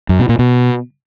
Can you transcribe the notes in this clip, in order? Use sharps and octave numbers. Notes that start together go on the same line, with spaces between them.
F#2
B2
A#2
B2